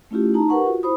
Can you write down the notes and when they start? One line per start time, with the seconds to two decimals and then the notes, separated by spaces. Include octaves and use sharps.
0.11 A3 C#4 E4 F4 G4
0.34 D#4 A5 A#5
0.49 G4 A#4 B4 F#5 C#6
0.65 F4 F#4
0.83 E4 C5 B5 D#6